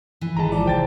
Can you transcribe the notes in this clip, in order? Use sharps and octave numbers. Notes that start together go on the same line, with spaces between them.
E3
G#1 D#3 G#3 A5 A#5
F3 D5
C2 C5 G5 A6